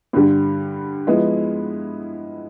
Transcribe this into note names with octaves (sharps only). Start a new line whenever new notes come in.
G2 D3 G3
F3 G#3 B3 E4